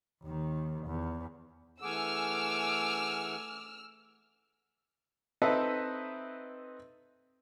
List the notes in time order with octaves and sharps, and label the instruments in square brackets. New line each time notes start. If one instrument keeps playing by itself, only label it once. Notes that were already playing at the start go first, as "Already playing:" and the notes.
[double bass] D#2 D#3
E2
[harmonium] E3 G#4 F#5 [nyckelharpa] A3 G#5 [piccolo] D6 [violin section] E6 F6
[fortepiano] C4 D#4 A4 B4 D#5 E5